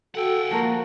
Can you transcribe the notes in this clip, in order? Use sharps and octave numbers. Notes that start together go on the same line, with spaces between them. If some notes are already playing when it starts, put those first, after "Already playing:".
F#4 A4 F#5 G5
F3 A#3 F#4 A#4 A5